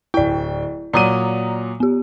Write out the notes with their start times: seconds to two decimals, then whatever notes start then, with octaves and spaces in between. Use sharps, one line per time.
0.14 D1 E4 D5 G5
0.93 A#2 F#3 D5 A#5 D#6 D#7
1.80 B3 G4